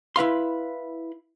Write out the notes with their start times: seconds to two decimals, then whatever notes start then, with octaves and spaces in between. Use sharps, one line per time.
0.16 E4 B4 F5 C6